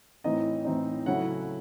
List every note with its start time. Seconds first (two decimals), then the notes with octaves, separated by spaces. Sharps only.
0.24 A2 E3 C4 D#4 D#5
0.65 A2 E3 C4 D#4
1.06 C#3 F#3 A3 C#4 E4 F#5